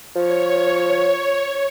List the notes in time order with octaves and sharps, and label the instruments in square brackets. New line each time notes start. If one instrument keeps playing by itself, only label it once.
[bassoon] F3 [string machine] C#5